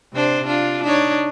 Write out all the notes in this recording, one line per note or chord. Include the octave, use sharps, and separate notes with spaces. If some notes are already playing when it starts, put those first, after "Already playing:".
C3 D4 C5
D4 F4
D4 D#4 C#5